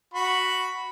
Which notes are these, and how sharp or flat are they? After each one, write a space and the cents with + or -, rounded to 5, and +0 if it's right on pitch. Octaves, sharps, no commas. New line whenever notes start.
F#4 +0 B5 +0